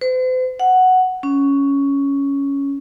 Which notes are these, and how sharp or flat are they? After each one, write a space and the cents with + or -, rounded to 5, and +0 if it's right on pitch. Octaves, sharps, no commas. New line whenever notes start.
C5 -40
F#5 +0
C#4 +5